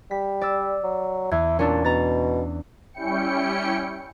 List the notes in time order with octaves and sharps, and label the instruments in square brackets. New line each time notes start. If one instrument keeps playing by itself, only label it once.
[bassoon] G3 [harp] B6
[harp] D5 E6
[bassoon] F#3
[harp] E2 G#6 [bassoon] E4
[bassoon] A#2 [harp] C#4 D4 A4
[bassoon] B2 [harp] A#5 A6
[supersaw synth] G3 C#4 E4 G5 C#7